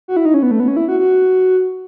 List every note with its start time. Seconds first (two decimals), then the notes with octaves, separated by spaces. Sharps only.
0.08 F#4
0.17 E4
0.25 D#4
0.34 C#4
0.43 B3
0.51 A3
0.60 B3
0.68 C#4
0.77 E4
0.88 F#4
1.00 F#4